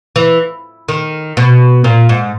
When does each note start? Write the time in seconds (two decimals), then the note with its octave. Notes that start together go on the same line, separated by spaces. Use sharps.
0.16 E3
0.88 D#3
1.37 B2
1.84 A#2
2.09 G#2